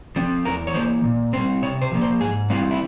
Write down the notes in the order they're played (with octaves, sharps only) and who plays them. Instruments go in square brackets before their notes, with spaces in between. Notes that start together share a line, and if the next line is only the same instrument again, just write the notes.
[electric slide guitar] F3 C4
E2 A#4
C#5
E3 A#3 C5
A#2
G3 C4 C5
C3 C#5
C5
F3 A#3
C5
G#2 G#4
E3 G3 C4 F4
E4